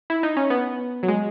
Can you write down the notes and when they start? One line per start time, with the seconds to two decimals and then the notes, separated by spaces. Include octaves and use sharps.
0.10 E4
0.23 D#4
0.37 C#4
0.50 B3
1.03 F#3
1.08 G#3